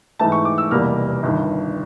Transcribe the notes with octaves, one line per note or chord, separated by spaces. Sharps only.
G#2 E3 A3 A5
C#6
D6
E6
F1 E2 B2 G3 A#3 F6
G1 G2 D#3